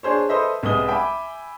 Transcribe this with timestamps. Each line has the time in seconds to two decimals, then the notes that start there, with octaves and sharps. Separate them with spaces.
0.03 D4 G#4 C5 C#5
0.29 A4 B4 C5 D#5 E5
0.63 C2 G#3 B3 D#6 G7
0.87 E5 G5 G#5 B5 D6